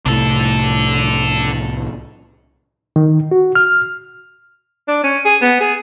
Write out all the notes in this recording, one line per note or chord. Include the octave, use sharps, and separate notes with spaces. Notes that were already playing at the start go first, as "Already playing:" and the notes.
C2 A2 D4 A4
D#3
F#4
F6
D4
C#4
G#4
B3
G#4